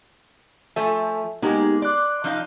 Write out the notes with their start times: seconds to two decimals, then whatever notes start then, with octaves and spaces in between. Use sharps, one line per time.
0.76 F3 A3 A4 E5 G#5
1.42 G#3 A#3 B3 D#4 G4 G#4
1.82 D5 C6 F#6
2.24 F3 D#4 F5